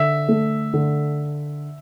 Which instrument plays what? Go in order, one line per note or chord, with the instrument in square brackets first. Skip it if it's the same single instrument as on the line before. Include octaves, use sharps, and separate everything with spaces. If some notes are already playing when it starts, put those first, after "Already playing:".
Already playing: [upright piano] D3 [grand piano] E5
[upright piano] A3
D3